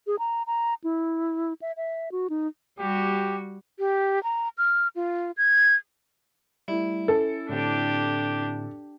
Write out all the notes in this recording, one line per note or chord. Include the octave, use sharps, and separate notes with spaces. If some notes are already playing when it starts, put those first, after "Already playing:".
G#4
A#5
A#5
E4
E5
E5
F#4
D#4
G3 F#4 G4
G4
A#5
F6
F4
G#6
G3 A3 E4
C#4 A4
A2 D3 C4 D4 G4